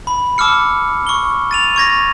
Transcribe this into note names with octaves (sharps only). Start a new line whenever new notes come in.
B5
A5 D6 E6 F6 C#7
C#6 G7
A6 D#7 F7
C#6 G#6 A#6